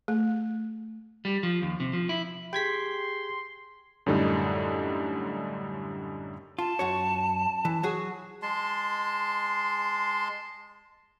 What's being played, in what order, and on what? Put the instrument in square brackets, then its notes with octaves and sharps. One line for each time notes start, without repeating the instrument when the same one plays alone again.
[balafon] A3
[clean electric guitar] G3
F3
D#2
C3
F3
E4
[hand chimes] G4 G#4 [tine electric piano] G5 G#6 B6 [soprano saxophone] C6
[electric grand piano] F#2 A2 D3 G3 D#4
[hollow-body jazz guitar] F4 [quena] A5
[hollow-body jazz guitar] F#2 F#4 C#5
E3
F#3 F#4 G#4
[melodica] G#3 A5 C6